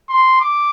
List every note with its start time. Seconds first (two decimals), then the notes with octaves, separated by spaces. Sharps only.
0.09 C6
0.41 D6